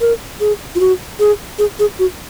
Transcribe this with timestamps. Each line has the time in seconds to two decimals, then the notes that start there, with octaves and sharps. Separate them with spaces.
0.01 A#4
0.40 G#4
0.75 F4
0.80 F#4
1.20 G#4
1.59 G#4
1.79 G#4
1.99 F#4